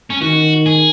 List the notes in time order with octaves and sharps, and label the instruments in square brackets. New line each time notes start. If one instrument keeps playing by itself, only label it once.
[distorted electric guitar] C#4
[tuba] D#3 [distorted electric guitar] F#4
[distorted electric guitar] G#4